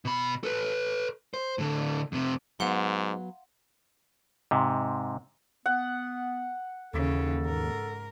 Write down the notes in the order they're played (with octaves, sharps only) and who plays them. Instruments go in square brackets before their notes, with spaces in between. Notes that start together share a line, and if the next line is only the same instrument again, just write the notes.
[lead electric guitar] B2 B5
A4 B4
C5
A2 D3
F2 C3
[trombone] G#2 [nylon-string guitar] F#3 B3 [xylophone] F5 F#5 C6
[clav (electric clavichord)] G#2 C3
[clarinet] B3 [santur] F#5
[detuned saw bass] D#2 [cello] C#3 E3 [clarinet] A4
[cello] G#2 A#4